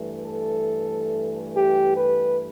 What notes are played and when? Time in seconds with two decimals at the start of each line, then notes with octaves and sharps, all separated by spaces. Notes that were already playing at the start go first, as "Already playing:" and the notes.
Already playing: G2 E3 A3
0.25 A4
1.55 G4
1.97 B4